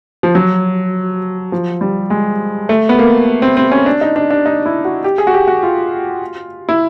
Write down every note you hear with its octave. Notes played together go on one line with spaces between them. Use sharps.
F3
F#3
F3
G3
G#3
A3
B3
A#3
C4
C4
C#4
D4
D#4
D4
D4
D#4
E4
F#4
G4
G#4
F#4
G4
F#4
F4
E4